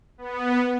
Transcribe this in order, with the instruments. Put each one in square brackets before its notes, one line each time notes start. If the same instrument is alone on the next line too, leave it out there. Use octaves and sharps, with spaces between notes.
[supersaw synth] B3